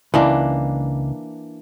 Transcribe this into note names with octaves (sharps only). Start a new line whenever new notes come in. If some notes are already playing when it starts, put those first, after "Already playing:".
C#2 E3 A#3 D4